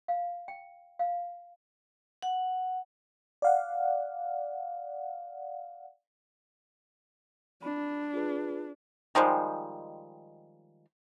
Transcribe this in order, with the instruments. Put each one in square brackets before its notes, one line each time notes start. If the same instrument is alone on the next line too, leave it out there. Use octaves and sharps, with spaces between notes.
[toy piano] F5
G5
F5
[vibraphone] F#5
[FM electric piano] D5 F5 F#5
[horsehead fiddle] D4 [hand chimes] B5
[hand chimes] F4 G#4 B4
[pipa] D#3 F3 G3 G#3